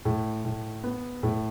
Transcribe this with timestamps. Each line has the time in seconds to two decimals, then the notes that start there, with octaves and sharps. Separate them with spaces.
0.05 A2
0.45 A2
0.84 B3
1.23 A2